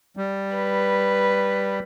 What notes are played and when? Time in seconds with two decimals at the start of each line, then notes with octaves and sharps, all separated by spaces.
0.17 G3
0.55 B4